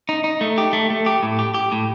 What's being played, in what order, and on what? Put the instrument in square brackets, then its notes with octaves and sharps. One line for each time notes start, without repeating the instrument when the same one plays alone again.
[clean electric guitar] D#4
D#4
A3
G4
A3
A3
G4
A2
G4
G4
A2